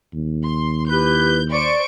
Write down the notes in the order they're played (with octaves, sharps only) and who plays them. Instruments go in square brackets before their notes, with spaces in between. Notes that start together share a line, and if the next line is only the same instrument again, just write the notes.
[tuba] D#2
[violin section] C6
[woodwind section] E4 G4 B4 [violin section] G6
[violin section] C5 C#6 D7 [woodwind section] D5